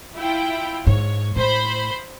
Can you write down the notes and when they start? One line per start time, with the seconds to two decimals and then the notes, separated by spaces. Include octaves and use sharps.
0.17 E4 F4 G5
0.87 G#2 C#5
1.36 A2 C5 B5